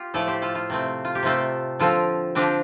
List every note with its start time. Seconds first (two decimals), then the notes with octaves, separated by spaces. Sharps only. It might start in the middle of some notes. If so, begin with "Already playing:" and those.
Already playing: F4 G4
0.14 A2 F3 A3 A4 D5
0.27 G4 C5
0.42 F4 A4
0.55 F4
0.70 C3 A3 C4
1.05 F4
1.15 G4
1.23 C3 A3 C4 F4 A4
1.79 D3 F3 C4 F4 A4
2.35 D3 F3 C4 D4 G4